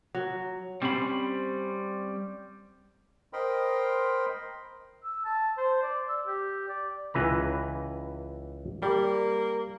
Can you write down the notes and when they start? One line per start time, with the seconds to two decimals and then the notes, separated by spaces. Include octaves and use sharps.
0.15 F#3
0.82 G3 C4 C#4 C5 B5
3.33 A#4 C5 D#5 G5 B5 C6
5.04 E6
5.25 A5
5.57 C5
5.83 D5
6.09 E6
6.27 G4
6.68 D5
7.14 C#2 E3 B4 A#5
8.83 G3 A#3